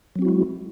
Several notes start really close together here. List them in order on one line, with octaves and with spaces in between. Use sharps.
F#3 C4 F#4 E4 G#3